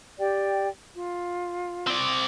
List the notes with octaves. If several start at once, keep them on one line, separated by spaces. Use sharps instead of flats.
G4 D5 G5
F4
C4 D5